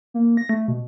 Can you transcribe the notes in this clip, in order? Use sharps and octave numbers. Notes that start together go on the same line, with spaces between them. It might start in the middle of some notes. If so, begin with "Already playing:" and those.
A#3
A#6
A3
B2